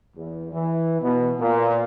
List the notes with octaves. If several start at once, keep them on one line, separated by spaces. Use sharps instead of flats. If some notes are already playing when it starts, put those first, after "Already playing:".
E2
E3
B2
A#2